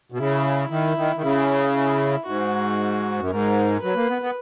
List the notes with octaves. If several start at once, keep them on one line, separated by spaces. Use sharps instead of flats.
B2
C#3 E4
D#3 E4
D#3
D#3
C#3 E4
E4
G#2 F#4
F#2
G#2 A#4
F#3 B4
A#3
B3
B3